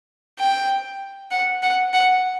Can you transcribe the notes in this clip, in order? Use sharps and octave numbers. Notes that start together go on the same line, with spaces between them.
G5
F#5
F#5
F#5